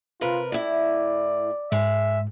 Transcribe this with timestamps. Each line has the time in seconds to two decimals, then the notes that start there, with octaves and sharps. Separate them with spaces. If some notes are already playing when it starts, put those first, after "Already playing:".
0.21 C3 F4 A#4 B4
0.52 A2 E4 D5
1.72 G#2 G#3 E5